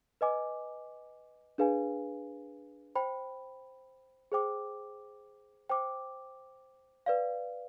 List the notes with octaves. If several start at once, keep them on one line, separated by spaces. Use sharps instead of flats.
B4 D#5 G#5 D6
D4 G#4 B4 F5 G#5
C5 G5 B5
G#4 C5 G5 D6
C5 G5 D6
B4 D5 F5